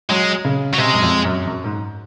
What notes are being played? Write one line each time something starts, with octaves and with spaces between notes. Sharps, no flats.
F#3 G#3
C#3
F#3
C3 G#3
F#2
F2
F#2
F#2
G#2